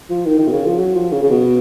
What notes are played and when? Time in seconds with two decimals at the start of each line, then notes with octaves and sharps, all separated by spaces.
0.10 F3
0.26 D#3
0.39 D#3
0.47 B2
0.52 C#3
0.66 F3
0.79 F#3
0.95 F3
1.12 C#3
1.23 C#3
1.30 B2